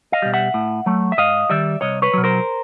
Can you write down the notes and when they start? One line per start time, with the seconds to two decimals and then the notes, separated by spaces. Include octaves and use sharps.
0.12 D#5 F5
0.22 B2 G3
0.34 E5 F#5
0.54 A2
0.86 F#3 A3
1.12 E5
1.18 G#2 D#5 F5
1.49 D#3 G3 D5 E5
1.81 C2 C#5 D#5
2.02 B4 C#5
2.13 B2 F#3
2.24 A#4 C5